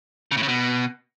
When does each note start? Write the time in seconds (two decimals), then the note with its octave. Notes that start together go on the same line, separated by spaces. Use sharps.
0.31 C#3
0.37 A2
0.43 C#3
0.48 B2